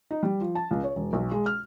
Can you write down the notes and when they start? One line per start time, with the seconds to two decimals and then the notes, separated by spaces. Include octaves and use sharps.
0.11 D#4
0.23 G3
0.40 F3
0.55 A5
0.71 C#2
0.84 C#5
0.96 E1
1.13 B1
1.31 G#3
1.46 F6